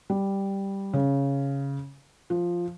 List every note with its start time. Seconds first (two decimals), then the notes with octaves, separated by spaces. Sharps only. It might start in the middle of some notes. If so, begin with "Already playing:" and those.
0.10 G3
0.93 C#3
2.30 F3